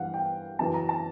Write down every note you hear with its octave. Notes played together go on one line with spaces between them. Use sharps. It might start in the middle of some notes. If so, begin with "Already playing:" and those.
Already playing: G2 E3 F5 F#5
G5
F#2 C#3 E3 A5
A#5
A5